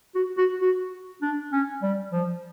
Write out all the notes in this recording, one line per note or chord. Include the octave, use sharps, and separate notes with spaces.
F#4
F#4
F#4
D4
C#4
G3
F3